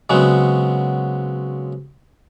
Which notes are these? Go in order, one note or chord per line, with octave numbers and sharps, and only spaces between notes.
C#3 F#3 G#3 B3 C4